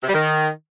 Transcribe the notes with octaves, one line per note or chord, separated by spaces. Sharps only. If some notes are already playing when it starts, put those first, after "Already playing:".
C3
G3
D#3